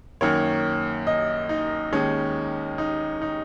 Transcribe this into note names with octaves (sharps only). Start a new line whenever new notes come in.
F#2 D#3 A#3 C#5
D#5
D#4
D#2 D#3 G#3 C#4
D#4
D#4